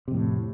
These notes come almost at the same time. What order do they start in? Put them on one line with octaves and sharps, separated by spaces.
C3 F2 A2